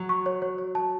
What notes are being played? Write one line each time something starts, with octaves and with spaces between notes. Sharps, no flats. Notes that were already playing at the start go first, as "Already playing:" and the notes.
Already playing: F#3
C#6
C#5
C#5
C#5
A5